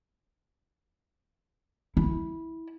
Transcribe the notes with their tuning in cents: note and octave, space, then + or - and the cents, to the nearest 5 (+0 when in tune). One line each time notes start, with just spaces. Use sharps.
E4 -15